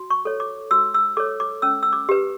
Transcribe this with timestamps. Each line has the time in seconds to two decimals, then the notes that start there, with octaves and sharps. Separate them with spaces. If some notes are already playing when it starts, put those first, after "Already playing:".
Already playing: F#4
0.10 C#6
0.25 A4 C#5
0.40 D6
0.71 F#4 E6
0.94 E6
1.17 A4 C#5 D6
1.40 D6
1.62 C#4 E6
1.83 E6
1.93 D6
2.09 G4 B4